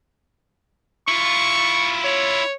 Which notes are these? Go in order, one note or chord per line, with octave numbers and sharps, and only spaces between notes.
E4 F4 C#6
C#5